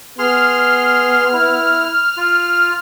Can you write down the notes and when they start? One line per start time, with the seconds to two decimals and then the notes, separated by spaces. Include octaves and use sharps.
0.19 B3 G#4 C6 F6
1.33 E4
2.17 F4